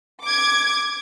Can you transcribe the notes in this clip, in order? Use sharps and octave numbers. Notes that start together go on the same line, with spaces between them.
D6 G#6